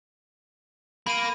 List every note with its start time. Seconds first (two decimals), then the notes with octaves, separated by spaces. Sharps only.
1.07 A#3 B5 D#7